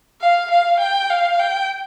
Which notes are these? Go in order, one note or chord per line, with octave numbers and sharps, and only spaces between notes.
F5
F5
G5
F5
G5